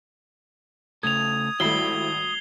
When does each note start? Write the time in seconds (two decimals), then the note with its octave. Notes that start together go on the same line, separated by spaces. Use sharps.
1.03 C#3 A3 A4 D#6 G#6 F7
1.60 G#1 G3 A3 E4 C7 G7